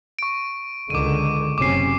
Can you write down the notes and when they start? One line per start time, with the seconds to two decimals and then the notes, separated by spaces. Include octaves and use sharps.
0.19 C#6 D7
0.90 C#2 D3 D#3 D6 D#7
1.58 F#1 C3 C#4 D6 C7